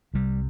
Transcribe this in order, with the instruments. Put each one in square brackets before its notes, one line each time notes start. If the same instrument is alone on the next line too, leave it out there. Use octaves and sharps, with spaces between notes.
[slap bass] C2 C3 G3